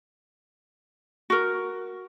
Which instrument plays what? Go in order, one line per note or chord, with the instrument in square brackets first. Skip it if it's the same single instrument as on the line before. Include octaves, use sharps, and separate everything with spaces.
[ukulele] F#4 A#4